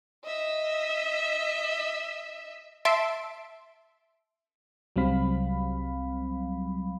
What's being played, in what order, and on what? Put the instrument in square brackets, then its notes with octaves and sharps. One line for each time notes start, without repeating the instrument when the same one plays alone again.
[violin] D#5 E5
[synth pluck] E5 A5 C6 D7
[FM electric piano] C2 F#3 G3 C4 F5 B5